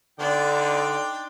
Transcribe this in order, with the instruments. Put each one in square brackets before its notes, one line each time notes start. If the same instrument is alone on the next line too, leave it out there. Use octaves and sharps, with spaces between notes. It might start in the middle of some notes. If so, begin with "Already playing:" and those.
[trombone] D3 [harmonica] D4 G5 D6 [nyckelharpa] D#4 C6 [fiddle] D5